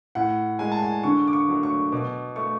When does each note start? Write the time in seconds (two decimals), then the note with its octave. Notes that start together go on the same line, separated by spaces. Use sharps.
0.15 A2 F#5
0.59 G#3 G#5
0.72 A5
0.83 G#5
1.03 D3 C#6
1.28 D6
1.33 C#6
1.49 F#3 A3
1.63 C#6
1.92 B2 D6
2.36 A3 C#6